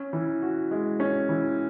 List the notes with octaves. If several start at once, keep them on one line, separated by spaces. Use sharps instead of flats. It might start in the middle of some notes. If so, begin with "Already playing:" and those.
Already playing: C#4
E3
F#4
G#3
C#4
E3